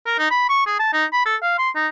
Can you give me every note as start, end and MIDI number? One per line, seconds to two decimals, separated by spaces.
0.06 0.16 70
0.18 0.27 63
0.31 0.45 83
0.49 0.64 85
0.66 0.75 68
0.79 0.89 81
0.93 1.05 63
1.12 1.25 83
1.25 1.36 69
1.42 1.57 77
1.58 1.70 84
1.75 1.87 63